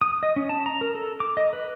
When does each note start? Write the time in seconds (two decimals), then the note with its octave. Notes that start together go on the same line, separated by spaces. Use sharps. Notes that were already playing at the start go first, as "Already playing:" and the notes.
0.01 D#6
0.23 D#5
0.36 C#4
0.49 A5
0.66 A#5
0.81 A#4
0.95 A4
1.20 D6
1.37 D#5
1.53 B4